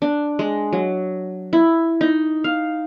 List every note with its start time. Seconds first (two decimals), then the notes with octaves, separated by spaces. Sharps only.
0.02 D4
0.39 G#3
0.73 F#3
1.53 E4
2.01 D#4
2.44 F5